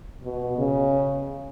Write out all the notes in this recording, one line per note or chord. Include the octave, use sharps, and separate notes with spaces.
B2
C#3